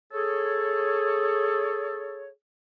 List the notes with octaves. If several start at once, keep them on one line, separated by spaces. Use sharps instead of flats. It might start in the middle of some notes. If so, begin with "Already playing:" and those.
G#4 A4 C#5